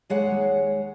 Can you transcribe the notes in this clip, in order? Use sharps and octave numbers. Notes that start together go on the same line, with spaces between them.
D#2 G#3 C#5 F#5